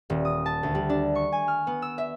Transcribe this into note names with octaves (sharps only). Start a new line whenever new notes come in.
D#1
D#6
A5
D2
G3
D4
C#6
G#5
F6
B3
E6
E5